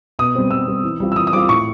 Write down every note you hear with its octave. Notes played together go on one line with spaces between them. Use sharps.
B2 D#6
G3 C4
B2 E6
G3 C4
E3
G3 C4 F4
E6
E3 D#6
D#6
G3 C4 F4 D6
A2 C#6